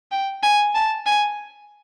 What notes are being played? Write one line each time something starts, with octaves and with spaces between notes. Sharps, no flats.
G5
G#5
A5
G#5